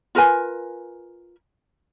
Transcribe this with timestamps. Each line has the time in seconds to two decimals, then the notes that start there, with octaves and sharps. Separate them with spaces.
0.15 F4 A#4 B4 G#5